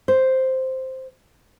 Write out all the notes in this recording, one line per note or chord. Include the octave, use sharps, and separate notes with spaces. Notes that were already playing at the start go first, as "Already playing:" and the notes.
C5